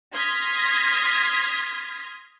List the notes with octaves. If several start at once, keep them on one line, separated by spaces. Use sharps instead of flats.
C6 D#6 F6 G#6 A#6 B6